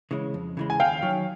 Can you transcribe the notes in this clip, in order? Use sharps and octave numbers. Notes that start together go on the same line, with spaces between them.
C#3 E3 G#3
F2
C#3 E3 G#3
G#5
D#2 F5 G5
D#3 F#3